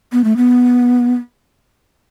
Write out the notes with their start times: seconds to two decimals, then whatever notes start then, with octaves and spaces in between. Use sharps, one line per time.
0.13 B3
0.24 A3
0.37 B3